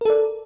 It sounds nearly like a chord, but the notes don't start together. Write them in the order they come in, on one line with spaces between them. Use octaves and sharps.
A#4 A4 D5